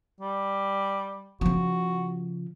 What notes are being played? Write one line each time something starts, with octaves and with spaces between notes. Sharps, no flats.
G3
C#3 F3 F#4